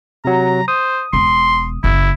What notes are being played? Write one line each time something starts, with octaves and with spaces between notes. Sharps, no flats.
C3 F#3 A#5
C5 D#6
E1 C6
F#1 E4